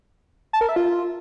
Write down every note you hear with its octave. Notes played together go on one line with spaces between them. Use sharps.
A5
A#4
E5
F4